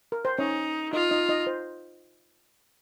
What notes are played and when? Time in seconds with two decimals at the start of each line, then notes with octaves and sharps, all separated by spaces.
0.12 A#4
0.25 C5
0.38 C#4 D#4 C#5
0.93 D#4 F4 D#5
1.11 D#4 D#5
1.29 D#4 D#5
1.47 C5